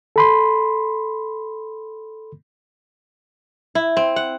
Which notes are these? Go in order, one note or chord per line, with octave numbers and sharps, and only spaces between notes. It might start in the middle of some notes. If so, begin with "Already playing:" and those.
A4 B5 C6
E4
C4
F#5